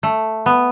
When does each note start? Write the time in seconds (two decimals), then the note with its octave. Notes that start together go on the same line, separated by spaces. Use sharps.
0.03 A3
0.46 B3